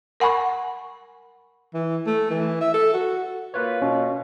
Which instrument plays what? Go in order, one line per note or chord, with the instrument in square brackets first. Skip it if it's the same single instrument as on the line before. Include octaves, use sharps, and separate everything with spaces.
[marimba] A#4 F#5 G#5 B5 C#6
[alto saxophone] E3
A3
E3
E5
A4
F#4
[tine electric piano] A#3 F4 C#5 [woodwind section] B4
[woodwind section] B2 [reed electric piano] C#4